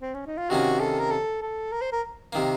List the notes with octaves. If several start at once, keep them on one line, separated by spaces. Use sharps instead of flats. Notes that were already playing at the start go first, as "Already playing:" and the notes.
C4
C#4
D#4
F4
C3 D#3 A#3 C#4 F#4
A4
A#4
A4
A4
A#4
C5
A#4
C3 D#3 A#3